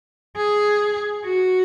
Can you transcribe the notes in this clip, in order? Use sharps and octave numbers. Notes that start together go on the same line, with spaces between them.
G#4
F#4